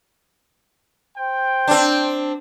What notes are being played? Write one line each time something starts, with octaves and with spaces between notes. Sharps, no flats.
C5 G5
C4 D4